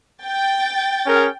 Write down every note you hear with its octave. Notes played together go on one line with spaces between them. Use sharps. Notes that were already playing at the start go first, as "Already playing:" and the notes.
G5 A6
C#4 G#4 A#4